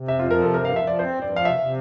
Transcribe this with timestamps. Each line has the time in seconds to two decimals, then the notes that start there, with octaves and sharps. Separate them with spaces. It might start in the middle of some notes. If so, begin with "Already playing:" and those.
Already playing: C3
0.08 F2 E5
0.19 F3 F4
0.31 A#4
0.38 C3 A4
0.53 G2 A#4
0.65 F3 F5
0.76 E5
0.84 F3 D5
0.99 C4 C5
1.14 G2
1.22 D5
1.30 F3
1.36 F5
1.45 C3 E5
1.60 C3